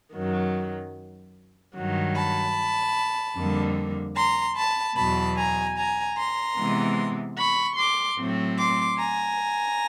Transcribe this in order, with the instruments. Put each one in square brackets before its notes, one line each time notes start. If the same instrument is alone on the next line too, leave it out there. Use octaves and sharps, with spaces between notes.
[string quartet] F#2 D#3 F#3
G2 D#3 F#3
A5 B5
F2 D3 G3 A#3
A#5 C6
A5 B5
E2 B2 F#3 A5 B5
G#5 A#5
G#5 A#5
A#5 C6
C3 E3 G#3 B3
B5 C#6
C6 D6
A2 F#3 A3 C4
C6 D6
G#5 A#5